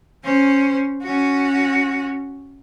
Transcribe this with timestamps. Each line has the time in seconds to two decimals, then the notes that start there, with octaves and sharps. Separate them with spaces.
0.24 C#4 C5
1.03 C#4 F#4